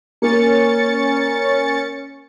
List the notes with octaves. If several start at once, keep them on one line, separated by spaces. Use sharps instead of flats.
A#3 C#4 A6 C#7